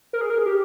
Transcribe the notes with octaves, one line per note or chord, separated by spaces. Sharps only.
A#4
G#4
A#4
G#4
G4